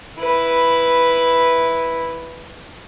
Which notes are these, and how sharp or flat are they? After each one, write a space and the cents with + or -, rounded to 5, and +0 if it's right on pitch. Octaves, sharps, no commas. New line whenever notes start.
E4 +0 B4 +0